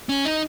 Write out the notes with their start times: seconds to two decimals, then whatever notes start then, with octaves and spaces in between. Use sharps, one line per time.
0.09 C#4
0.25 D#4